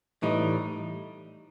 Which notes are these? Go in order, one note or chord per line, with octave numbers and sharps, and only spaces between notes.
A2 E3 G3 D#4